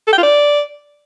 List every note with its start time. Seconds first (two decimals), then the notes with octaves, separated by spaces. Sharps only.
0.07 A4
0.13 G5
0.18 F4
0.23 D5